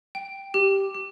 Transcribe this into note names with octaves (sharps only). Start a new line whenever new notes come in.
G5
G4
G4